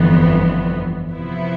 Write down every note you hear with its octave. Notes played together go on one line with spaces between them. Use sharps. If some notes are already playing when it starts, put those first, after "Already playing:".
Already playing: G1 F2 E3 B3
C3 F3 B3 E4